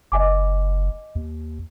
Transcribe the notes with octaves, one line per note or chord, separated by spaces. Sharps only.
F#1 D#5 G#5 D6
D#2